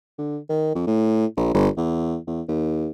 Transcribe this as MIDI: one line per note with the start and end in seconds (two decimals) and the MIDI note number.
0.19 0.37 50
0.49 0.73 51
0.75 0.86 41
0.87 1.26 45
1.37 1.53 34
1.54 1.68 31
1.77 2.17 40
2.27 2.42 40
2.48 2.90 39